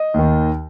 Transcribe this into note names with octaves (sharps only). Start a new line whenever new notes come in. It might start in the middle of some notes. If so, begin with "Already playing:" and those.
Already playing: D#5
D#2 D#3